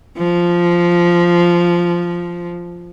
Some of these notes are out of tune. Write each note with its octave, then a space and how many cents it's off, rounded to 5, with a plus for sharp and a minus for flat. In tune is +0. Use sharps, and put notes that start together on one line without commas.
F3 -5